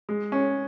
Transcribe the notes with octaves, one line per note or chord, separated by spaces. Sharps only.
G#3
C#4